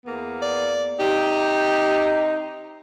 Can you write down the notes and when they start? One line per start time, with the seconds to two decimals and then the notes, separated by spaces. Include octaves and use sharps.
0.06 E2 A#3 B3
0.42 D5
0.99 C3 D#4 G4